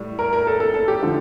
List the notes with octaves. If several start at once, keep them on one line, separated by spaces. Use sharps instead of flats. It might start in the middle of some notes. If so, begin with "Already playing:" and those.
Already playing: A2 G3
A#4
A#4
A4
A4
A4
G4
D3 F3